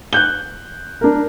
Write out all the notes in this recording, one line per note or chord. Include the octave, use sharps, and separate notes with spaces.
F#6 G6 G7
D4 A#4